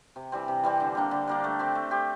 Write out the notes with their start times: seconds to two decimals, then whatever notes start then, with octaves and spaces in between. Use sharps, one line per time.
0.16 C3
0.32 E3 G3 C4
0.48 C3
0.63 E3 G3 C4
0.80 D3
0.95 G3 A#3 D4
1.11 D3
1.27 G3 A#3 D4
1.44 A3
1.59 C4 G4
1.75 A3
1.91 C4 G4